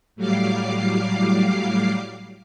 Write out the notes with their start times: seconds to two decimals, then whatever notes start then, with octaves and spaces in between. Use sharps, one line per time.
0.16 A2 F#3 G3 F5 D6 C7